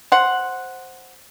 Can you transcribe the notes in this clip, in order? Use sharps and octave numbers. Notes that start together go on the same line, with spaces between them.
C5 F#5